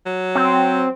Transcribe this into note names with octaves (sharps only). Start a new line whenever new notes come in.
F#3
C4